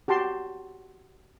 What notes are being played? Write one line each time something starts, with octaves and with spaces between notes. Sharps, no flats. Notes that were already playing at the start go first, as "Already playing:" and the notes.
F#4 G4 A5 C6